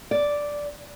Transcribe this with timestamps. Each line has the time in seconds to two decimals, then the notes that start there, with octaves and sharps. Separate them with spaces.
0.11 D5